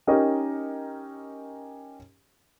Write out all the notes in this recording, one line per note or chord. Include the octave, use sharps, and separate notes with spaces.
C#4 D#4 G4 A#4 D#5